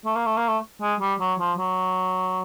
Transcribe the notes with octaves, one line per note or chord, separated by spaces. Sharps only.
A3
A#3
A3
A#3
A3
G#3
G3
F#3
F3
F#3